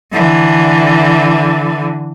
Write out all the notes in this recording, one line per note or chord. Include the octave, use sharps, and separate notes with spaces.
D3 E3